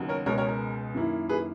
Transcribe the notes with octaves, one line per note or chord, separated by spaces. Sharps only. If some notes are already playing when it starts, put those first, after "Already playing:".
Already playing: D#2 C#3 F#3 B3 D#4
A#4 C#5
C#2 B2 G#3 A#4 C#5
A#4 C#5
A#4
F#2 D#3 A#3 E4
G#4 B4